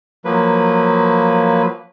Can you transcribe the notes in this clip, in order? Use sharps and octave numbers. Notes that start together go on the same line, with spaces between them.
F3 F#3 A#3 B4